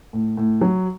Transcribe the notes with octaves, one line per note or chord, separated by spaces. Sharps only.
A2
A2
F#3